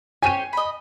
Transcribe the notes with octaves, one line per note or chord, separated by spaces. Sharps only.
G4 C5 C#5 G#5 D#7
D#5 B5